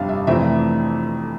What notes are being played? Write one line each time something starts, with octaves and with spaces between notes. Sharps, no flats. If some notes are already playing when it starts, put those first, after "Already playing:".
Already playing: G1 F2 C3 G3 D4 F5
E5
F1 F2 E3 A3 C4 E5